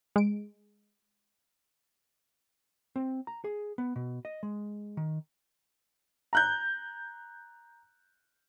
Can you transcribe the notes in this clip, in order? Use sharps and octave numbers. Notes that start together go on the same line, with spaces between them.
G#3 D7
C4
A#5
G#4
B3
B2
D#5
G#3
D#3
A#5 F#6 G6